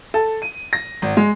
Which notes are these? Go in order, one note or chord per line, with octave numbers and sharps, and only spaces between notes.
A4
D#7
A#6
G#1
G#3